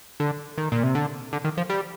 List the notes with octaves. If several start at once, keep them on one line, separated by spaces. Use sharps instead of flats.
D3
D#3
A#2
C3
D3
D3
D#3
F3
G3